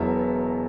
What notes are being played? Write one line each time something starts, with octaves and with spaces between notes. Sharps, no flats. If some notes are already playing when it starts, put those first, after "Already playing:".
Already playing: E1 E2 B2 F#3 B3 E5